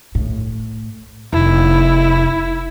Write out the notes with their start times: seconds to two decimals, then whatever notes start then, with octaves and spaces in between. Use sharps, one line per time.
0.15 A2
1.33 F1 E4